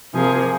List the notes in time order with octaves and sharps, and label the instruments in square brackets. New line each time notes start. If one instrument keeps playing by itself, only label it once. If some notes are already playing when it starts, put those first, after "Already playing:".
[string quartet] C3 F3 A#3 G#4